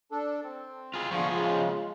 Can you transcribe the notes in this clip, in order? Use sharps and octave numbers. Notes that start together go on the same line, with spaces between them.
D4 A4
C4
F4 G#4
D3 F3 F4 G#4 C#6
C#3 G#3 F4